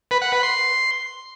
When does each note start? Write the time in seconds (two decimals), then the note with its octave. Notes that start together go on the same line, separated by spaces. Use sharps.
0.11 B4
0.22 F#5
0.32 B4
0.43 C6